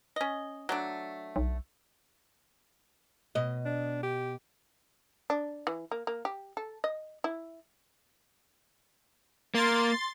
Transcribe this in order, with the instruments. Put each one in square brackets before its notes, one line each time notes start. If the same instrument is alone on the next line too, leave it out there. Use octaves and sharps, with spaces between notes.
[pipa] C#4 D#5
F#3 A3 D4
[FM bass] B1
[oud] B2 D#5
[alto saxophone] D4
G4
[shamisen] D4
E3
A#3
A#3
G4
A4
D#5
E4
[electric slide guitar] A#3 [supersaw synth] C6 A6